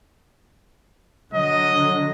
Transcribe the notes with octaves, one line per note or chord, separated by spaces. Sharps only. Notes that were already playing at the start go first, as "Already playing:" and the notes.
D3 F#3 D#5